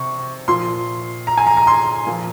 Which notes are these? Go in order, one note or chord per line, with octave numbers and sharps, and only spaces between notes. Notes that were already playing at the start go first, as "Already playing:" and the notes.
Already playing: C3 C#6
A#2 F3 C6
A#5
G#5
A#5
A#5
C6
A#2 F3